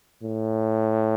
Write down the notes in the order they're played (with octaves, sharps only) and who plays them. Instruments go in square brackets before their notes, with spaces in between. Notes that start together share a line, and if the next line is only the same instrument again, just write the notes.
[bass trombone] A2